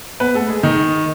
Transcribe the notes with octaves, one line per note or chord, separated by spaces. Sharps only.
B3 B4
A3 A4
G#3 G#4
D#3 D#4